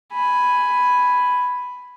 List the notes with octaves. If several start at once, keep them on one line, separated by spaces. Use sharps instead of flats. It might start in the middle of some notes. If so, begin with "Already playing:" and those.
G#5 B5